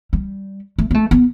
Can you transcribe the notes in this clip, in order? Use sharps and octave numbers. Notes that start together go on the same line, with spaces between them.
G3
A3
B3
A3
B3